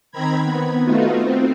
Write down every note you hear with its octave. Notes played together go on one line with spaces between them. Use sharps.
D#3 C4 A#5 B5 G#6
B3
A3 B3 D#4 F4 F#4
C4